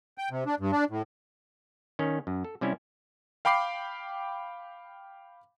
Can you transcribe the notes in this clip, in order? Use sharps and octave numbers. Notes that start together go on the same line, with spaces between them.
G5
C3
D4
G2
D4
A2
D#3 C#4
F#2
A4
C3 G3 C#4 E4
F5 G5 B5 D6 C7